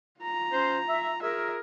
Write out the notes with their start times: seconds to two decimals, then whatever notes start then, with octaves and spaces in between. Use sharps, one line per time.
0.21 F4 A#5
0.52 C#4 C5
0.89 E5
1.23 F4 G#4 A#4 E5